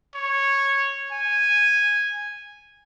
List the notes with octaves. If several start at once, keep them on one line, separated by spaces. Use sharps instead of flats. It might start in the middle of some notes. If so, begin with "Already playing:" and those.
C#5
G#5